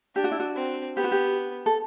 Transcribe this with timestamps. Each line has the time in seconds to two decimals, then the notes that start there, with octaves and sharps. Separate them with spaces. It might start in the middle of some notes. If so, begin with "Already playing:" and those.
0.16 D4 G4
0.24 F#4
0.31 E4
0.40 F#4
0.56 C4
0.97 B3 G4
1.04 F#4
1.12 G4
1.66 A4